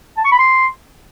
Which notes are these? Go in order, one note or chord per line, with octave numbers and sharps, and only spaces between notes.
A5
C#6
B5
C6